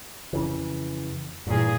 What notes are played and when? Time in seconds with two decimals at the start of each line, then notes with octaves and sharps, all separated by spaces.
0.33 F2 C#3 E3
1.47 G2 A#2 E3 G#4